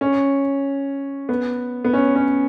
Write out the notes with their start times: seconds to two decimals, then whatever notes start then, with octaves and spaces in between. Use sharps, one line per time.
0.01 C#4
1.29 B3
1.85 B3
1.93 C#4
2.15 C#4